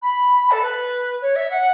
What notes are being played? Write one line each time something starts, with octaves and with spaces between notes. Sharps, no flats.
B5
A4
B4
C#5
E5
F#5